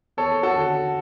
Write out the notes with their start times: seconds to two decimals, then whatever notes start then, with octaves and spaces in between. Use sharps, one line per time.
0.17 E2 A4 C#5
0.43 F#4 A4
0.55 D3